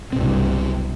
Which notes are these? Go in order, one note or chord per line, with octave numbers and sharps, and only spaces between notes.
F#1 C2 G2 B2 C4